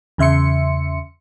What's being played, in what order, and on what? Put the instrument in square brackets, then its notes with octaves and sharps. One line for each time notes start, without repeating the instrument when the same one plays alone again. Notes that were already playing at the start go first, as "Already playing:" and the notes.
[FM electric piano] E2 C#3 E5 C6 C#7